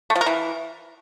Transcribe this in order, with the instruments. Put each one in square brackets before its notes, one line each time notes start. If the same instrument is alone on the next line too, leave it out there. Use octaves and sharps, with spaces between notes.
[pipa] A3
F3
A#4
E3